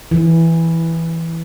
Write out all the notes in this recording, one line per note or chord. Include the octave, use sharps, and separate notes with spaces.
E3